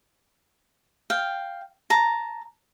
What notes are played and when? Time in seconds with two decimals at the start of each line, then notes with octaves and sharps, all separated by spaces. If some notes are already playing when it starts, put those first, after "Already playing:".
1.10 F5 G5
1.90 A5 A#5